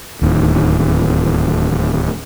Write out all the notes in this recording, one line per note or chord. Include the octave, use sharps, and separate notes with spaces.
D1 D#2